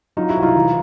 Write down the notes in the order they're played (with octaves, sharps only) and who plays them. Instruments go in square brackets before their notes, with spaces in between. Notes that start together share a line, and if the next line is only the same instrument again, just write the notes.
[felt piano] F#3 D#4 F4
E4 F#4
C2
D#4 F4
E3